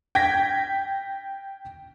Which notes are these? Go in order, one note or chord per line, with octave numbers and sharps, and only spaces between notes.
G5 G#6 A#6 B6